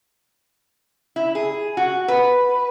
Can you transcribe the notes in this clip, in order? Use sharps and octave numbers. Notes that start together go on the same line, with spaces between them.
E4
G#4
F#4
B4